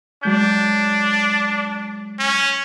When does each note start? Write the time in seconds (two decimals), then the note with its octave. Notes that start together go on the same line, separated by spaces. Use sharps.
0.23 F#3 G#3 D4 G6
2.19 C#4